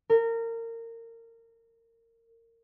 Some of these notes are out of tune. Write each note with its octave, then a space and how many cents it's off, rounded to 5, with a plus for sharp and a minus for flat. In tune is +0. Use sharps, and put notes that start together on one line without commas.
A#4 -25